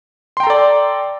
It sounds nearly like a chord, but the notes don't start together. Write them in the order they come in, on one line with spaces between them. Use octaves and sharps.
C6 G5 A#5 A4 D5